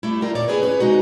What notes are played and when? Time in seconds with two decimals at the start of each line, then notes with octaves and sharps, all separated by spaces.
0.03 G3 A3 E4
0.22 D4 F4 A#4 G5
0.35 A#2 C#5 D5
0.48 E4 G#4 B4 C#5
0.62 C#4 B4 C#5
0.80 C3 G#3 D#4 F#4